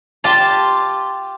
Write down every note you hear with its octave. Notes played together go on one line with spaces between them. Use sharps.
F4 G4 A5 C6